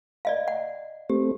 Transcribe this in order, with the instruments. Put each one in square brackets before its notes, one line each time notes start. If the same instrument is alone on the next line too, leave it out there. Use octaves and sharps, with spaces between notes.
[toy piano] D5 D#5 F5
F#5
[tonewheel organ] A3 C4 [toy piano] G4